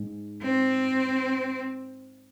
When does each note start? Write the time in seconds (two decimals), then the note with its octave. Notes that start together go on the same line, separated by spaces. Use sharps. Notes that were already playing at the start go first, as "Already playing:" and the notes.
Already playing: G#2 G#3
0.43 C4